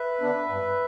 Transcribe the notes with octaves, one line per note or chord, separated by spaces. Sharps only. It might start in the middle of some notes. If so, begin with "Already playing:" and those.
Already playing: B4 E5
D3 B3 D4
G2